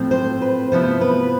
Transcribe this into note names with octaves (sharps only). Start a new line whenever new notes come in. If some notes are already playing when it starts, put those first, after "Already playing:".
Already playing: A2 F3 C4
C5
B4
C3 F3 B3 E4 C5
B4